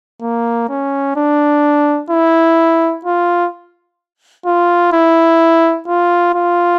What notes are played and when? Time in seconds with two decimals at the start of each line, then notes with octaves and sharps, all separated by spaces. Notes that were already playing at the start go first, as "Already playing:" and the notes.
0.22 A#3
0.69 C#4
1.16 D4
2.10 E4
3.05 F4
4.46 F4
4.93 E4
5.88 F4
6.35 F4